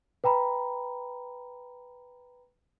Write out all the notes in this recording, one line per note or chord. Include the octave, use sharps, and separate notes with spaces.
B4 G5 A#5 B5